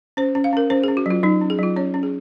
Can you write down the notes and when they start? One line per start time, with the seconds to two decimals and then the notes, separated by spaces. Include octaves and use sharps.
0.17 C#4 C5
0.35 C#4
0.44 F5
0.53 C#4 A#4
0.70 C#4 C5
0.84 G#4
0.88 C#4
0.97 F#4
1.06 F#3 F4
1.23 F#3 D#4
1.41 C#4
1.50 G#4
1.59 F#3 F4
1.76 C#4 C#5
1.94 C#4
2.03 G#4